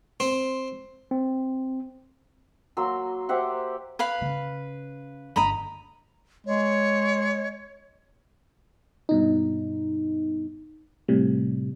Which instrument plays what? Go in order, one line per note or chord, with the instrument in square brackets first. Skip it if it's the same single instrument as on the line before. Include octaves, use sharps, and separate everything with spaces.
[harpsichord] C4
[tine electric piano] C4
[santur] F#3 A#3 C6 E6
G4 C5 E5 F#5
[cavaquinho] B4 F5 B5
[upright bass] C#3
[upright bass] G1 D4 [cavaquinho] D#5 A#5 B5
[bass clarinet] G#3 [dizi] C#5
[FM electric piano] G2 B2 D#4
A2 C3 G3